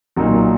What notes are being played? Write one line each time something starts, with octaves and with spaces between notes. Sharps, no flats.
B1 A#2 F#3 A#3 D#4